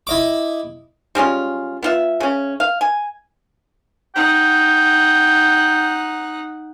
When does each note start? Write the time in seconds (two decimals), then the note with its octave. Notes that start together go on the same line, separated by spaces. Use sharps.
0.07 E4 D#5 D6
1.15 G3 G#3 C#4 F4
1.83 B3 F4 E5
2.20 C#3 C#4
2.60 F5
2.81 G#5
4.15 D#4 F#5 G5